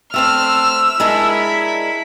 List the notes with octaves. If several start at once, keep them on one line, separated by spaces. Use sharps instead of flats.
A3 C4 D4 E6 F6
G#3 D4 E4 A#4 B5